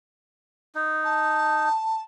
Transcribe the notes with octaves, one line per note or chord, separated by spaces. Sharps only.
D#4
A5